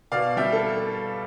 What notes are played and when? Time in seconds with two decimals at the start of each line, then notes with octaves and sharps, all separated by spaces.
0.12 B2 D5 F5
0.37 G3 E5 G5
0.53 A4